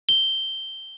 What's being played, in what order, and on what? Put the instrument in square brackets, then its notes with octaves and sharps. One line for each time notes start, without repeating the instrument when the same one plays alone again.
[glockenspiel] G7